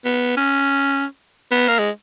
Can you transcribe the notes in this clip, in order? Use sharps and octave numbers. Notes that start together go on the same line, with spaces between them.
B3
C#4
B3
A#3
G#3